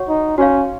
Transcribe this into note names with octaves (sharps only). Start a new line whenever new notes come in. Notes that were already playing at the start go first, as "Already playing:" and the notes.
Already playing: F#4 C#5 F#5 C#6
D#4
C#4 F#4 C#5 F5